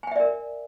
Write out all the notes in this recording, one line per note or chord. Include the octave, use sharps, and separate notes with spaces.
A#4 D5 E5 G5 G#5